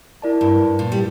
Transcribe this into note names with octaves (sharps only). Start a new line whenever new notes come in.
E4 A#4 D5 A5
G2
A#2
G3